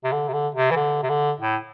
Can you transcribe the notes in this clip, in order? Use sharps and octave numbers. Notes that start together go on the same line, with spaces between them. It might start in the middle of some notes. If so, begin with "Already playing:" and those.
C3
D3
C3
D3
C3
E3
D3
C3
D3
A2